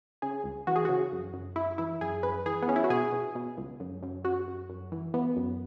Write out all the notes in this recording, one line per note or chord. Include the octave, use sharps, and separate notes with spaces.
C#3 G#4
C#2
E3 F#4
G#4
C#3 F#4
F#2
F#2
F#2 E4
E3 E4
F#2 G#4
F#2 B4
E3 G#4
B3
E3 C#4
E4
F#4
B2 G#4
B2
B2
C#2
F#2
F#2
F#2 F#4
F#2
F#2
E3
E3 B3
F#2